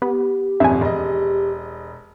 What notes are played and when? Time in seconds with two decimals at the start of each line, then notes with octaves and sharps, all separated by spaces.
0.02 B3 G4
0.60 D#1 G#1 F2 E5 G#5
0.81 E1 D#5